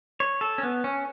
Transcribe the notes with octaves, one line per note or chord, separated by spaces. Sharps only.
C#5
A4
C#4
B3
C#4